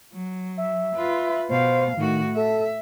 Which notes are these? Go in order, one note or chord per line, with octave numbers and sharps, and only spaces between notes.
F#3
E5
F4 B4
B2 C5 F5
A2 D#3 F#4
A4 E5